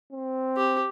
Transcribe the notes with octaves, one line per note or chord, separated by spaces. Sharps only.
C4
G4